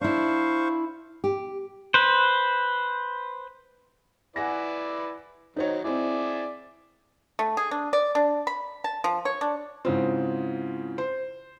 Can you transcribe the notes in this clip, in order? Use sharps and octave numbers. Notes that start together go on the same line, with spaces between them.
D4 E4 C5 F5 C#6
G4
B4 C5
E4 B4 D5 F#5 G#5 A#6
D#3 F#3 D#4 C5 C#5
C4 E4 G#4 D5 E5
A3
G#4
D4
D5
D4
B5
A5
F3
C#5
D4
G#2 C#3 C4 E4 F4
C5